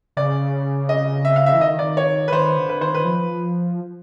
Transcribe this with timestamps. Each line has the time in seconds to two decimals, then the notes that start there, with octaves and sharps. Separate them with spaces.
0.17 C#3 D5
0.89 D#5
1.25 E5
1.36 F5
1.46 E5
1.53 E3
1.61 D#3 D#5
1.79 D5
1.97 C#5
2.28 B4
2.32 D#3 C5
2.57 D3
2.69 B4
2.81 D#3 C5
2.95 B4
3.05 F3